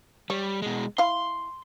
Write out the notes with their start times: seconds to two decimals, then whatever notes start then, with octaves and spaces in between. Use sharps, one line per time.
0.30 G3 C#5
0.62 B2 G#3
0.98 E4 F5 C6